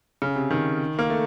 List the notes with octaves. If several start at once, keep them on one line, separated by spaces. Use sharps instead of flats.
C#3
C3
D#3
A#3
A3